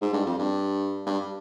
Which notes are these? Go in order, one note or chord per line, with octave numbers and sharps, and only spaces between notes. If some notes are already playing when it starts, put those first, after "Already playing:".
G#2
G2
F2
G2
G2